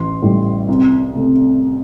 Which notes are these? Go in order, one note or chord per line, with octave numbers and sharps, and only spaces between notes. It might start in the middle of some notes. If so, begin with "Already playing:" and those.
Already playing: A1 C6
A2 G3
C2
C3 A3